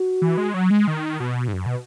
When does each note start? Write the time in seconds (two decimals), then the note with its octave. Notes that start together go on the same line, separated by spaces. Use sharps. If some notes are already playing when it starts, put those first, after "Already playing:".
Already playing: F#4
0.22 E3
0.38 G#3
0.54 F#3
0.70 G#3
0.87 D#3
1.20 B2
1.48 G#2
1.53 F#2
1.66 B2